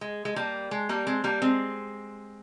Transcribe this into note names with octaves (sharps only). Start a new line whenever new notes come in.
G#3
G#3
G3 A#3
G#3
G3 A#3
G#3 C4
G3 A#3
G#3 C4